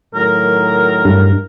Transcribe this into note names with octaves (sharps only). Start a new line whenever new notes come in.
A2 D#3 F#3 A#4
G2